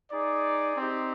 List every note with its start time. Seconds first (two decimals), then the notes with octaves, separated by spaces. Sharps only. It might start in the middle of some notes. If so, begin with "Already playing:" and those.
0.11 D#4 G#4 D5
0.77 C4 D#4 G4